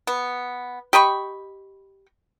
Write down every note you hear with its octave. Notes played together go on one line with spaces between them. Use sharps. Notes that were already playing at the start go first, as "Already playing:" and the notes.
B3
G4 D#5 B5 C#6